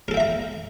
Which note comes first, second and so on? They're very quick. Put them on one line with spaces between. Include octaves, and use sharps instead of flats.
A#4 A4 G5 E5 A#5